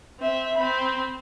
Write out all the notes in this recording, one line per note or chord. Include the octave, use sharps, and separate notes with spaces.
C4 E5
C4 B5